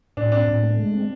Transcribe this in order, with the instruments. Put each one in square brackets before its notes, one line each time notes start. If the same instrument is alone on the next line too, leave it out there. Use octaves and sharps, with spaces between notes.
[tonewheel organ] A2 [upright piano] D4
[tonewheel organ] C4 [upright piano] D4
[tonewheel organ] A2
A3
G#3
C4